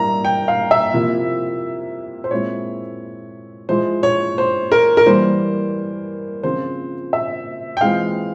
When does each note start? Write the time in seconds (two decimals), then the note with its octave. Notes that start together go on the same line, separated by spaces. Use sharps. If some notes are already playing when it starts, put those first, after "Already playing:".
Already playing: G3 A#3 E4 A#5
0.25 G5
0.48 F5
0.71 E5
0.93 C3 F3 A#3 E4
2.24 C5
2.31 A#2 G#3 C4 E4 C#5
3.69 F3 G#3 E4 C5
4.03 C#5
4.38 C5
4.72 A#4
4.97 A#4
5.06 E3 G3 A#3 C5
6.43 C#3 F3 C4 F4 C5
7.13 E5
7.77 G5
7.81 E3 G#3 C4 F4 F5